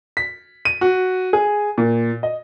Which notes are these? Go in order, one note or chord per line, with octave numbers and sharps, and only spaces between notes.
B6
D#7
F#4
G#4
A#2
D#5